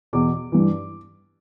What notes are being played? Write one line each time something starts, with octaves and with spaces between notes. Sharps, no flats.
E2 B2 D6
G2 E3